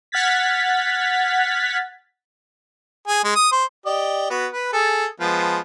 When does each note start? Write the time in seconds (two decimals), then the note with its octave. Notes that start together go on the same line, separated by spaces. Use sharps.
0.12 F#5 F6 F#6 G#6 A6 B6
3.08 G#4
3.24 G#3
3.36 D#6
3.52 C5
3.86 G4 D5 D#5
4.30 B3 F#4 B4
4.53 B4
4.73 G#4 A4
5.20 F3 G#3 B3